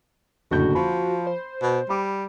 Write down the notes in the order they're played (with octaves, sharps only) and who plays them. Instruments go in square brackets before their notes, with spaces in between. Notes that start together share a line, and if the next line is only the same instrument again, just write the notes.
[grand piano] F#1 D3 G6 [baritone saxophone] A2 [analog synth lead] F#4
[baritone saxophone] F3 [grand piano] B5
[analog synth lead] C5
[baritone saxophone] B2
[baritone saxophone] G3 [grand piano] B5 D6